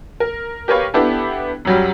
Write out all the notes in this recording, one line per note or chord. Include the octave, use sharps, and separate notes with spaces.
A#4
G4 A#4 B4 C#5 F5
B3 D4 E4 G4 A4
F#2 F#3 G3